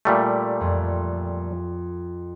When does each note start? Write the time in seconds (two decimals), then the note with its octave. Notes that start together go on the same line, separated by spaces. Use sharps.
0.05 A#2 G3 A3
0.61 F2